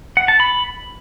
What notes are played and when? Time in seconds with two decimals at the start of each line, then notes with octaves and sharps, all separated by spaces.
0.17 F#5
0.28 A5
0.40 B5